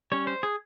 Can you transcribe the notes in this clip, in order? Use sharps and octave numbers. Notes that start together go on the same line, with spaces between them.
G3 C#4 C#5
C5
G#4